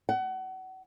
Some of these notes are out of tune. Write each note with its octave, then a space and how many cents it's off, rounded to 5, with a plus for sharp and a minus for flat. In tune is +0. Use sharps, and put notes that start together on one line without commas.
F#5 +30